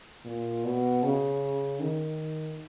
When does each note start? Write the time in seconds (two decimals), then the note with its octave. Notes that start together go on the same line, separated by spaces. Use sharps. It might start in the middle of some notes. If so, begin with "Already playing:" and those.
0.24 A#2
0.64 B2
1.03 C#3
1.80 D#3